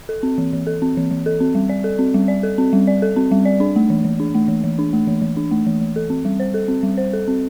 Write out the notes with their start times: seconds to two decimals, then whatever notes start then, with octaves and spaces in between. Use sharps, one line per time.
0.09 A4
0.23 C4
0.38 E3
0.53 E3
0.67 A4
0.82 C4
0.97 E3
1.11 E3
1.26 A4
1.40 C4
1.55 G3
1.69 D5
1.84 A4
1.99 C4
2.14 G3
2.28 D5
2.43 A4
2.58 C4
2.73 G3
2.87 D5
3.02 A4
3.16 C4
3.31 G3
3.45 D5
3.60 D4
3.76 A3
3.90 E3
4.05 E3
4.20 D4
4.35 A3
4.48 E3
4.64 E3
4.79 D4
4.93 A3
5.07 E3
5.22 E3
5.37 D4
5.51 A3
5.67 E3
5.81 E3
5.96 A4
6.10 C4
6.25 G3
6.40 C5
6.54 A4
6.68 C4
6.83 G3
6.98 C5
7.13 A4
7.28 C4